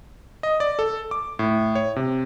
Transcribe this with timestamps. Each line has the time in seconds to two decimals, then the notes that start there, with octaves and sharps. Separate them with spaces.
0.43 D#5
0.60 D5
0.79 A4
1.11 D6
1.39 A2
1.75 C#5
1.96 C3